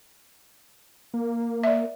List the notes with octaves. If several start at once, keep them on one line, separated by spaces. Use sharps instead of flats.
A#3
D5 E5